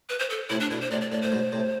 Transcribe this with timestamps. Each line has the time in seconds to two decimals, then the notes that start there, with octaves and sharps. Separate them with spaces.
0.09 B4
0.19 C5
0.30 A4
0.50 A2 C3 E4
0.60 D4
0.71 B2 D3 E4
0.81 C5
0.91 A2 C3 D5
1.01 D5
1.12 A2 D5
1.22 A2 C5
1.32 G#2 B2
1.52 A2 C3